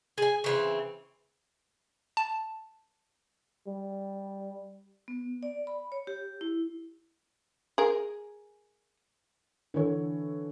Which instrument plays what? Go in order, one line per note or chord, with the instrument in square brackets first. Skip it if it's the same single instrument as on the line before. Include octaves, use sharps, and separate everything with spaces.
[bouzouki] G#4 G#5
C#3 E3 C4
[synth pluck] A5
[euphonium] G3
[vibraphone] B3
D5
B5
C#5
G4
E4
[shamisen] G#4 A#4
[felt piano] D3 E3 A4 C#5